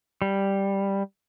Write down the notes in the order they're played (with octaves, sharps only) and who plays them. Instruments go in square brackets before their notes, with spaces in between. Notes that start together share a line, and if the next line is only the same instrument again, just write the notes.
[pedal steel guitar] G3